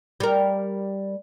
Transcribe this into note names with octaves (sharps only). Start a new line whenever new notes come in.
G3 A#4